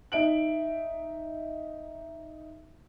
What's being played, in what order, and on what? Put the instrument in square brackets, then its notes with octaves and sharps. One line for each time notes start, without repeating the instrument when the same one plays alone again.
[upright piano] D#4 E5 D7 F#7